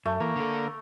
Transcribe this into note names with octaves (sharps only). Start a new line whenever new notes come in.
F#2 A3
E3 A#3
D3 A4